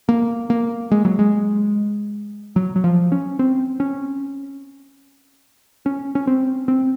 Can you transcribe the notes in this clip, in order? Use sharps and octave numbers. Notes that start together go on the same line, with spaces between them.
A#3
A#3
G#3
F#3
G#3
F#3
F#3
F3
C#4
C4
C#4
C#4
C#4
C4
C4